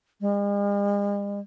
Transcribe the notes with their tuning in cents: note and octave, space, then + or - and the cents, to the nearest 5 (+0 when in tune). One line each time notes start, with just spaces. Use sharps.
G#3 -45